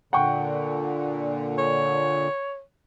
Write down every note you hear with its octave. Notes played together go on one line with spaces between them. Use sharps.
A#2 D3 F#5 G5 C#6
C#5